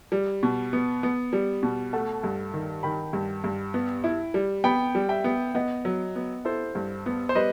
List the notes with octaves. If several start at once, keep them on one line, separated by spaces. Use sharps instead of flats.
G3
B2
B3
B3
G3
B2
A3 F#5 A5
G2
D#3
D#3 G5 B5
G2
G2
B3
E4
G3
B3 G5 B5
G3
E5 G5
B3
B3 D#5 F#5
F#3
B3
E4 A4 C5
G2
B3
C5
G3 B4 D#5